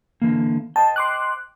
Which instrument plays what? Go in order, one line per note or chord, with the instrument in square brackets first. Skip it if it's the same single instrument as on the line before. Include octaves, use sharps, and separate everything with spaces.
[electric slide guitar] D3 E3 A#3
[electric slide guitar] C5 D#5 G5 [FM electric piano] A5
[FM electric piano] C6 D6 F#6